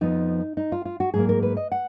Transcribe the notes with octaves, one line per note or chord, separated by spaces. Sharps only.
F2 F3 B3 D#4
D#4
F4
F4
F#4
G#2 F#3 A#3 G#4
A#4
B4
D#5
F#5